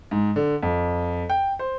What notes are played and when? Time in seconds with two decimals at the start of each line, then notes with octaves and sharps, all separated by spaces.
0.11 G#2
0.36 D3
0.63 F2
1.30 G5
1.59 C5